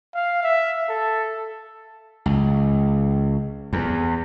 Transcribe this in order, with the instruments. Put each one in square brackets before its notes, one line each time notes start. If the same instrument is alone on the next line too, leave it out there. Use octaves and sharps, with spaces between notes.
[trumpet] F5
E5
A4
[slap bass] C#2
E2